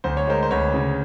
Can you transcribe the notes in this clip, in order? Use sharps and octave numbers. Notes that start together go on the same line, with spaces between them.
D2 C5
C#5
G#3 A#4 C5
C5
D2 B4 C#5
C#3